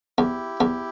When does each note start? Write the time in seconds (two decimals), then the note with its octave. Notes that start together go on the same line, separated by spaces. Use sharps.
0.18 E2 E4 G4
0.60 E2